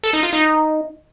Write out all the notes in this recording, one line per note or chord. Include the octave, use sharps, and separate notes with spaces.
A4
D#4
F4
D#4